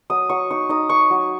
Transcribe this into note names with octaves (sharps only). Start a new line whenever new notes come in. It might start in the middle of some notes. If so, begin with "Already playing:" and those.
F#3 D#6
F#3 C#6
D#4 C#6
D#4 D#6
D#4 C#6
F#3